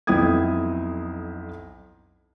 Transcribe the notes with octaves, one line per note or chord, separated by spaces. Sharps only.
B1 F2 E4 G5 D#6 G#6